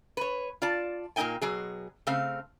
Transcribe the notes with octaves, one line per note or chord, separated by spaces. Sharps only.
B4 C#5
F4 D5 A5
A#2 A#3 C#4 D#4 G5 G#5
B2 F#3 G#4
C#3 A3 C4 F5